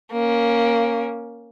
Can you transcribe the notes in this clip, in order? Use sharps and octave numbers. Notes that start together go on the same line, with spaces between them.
A#3 C#4